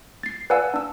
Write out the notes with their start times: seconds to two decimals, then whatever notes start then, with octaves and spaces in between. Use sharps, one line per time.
0.23 A6 C7
0.50 B4 D5 F5 F#5 G#5 E6
0.74 D4 E6